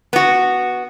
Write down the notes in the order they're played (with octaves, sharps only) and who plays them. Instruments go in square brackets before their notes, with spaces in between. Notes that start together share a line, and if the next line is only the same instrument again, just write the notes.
[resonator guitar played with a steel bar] B3 F#4